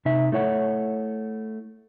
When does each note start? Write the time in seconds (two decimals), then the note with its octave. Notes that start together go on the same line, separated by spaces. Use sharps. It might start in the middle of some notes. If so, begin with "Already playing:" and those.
0.05 C3 D#4 E5
0.32 A3 E4 C#5 F#5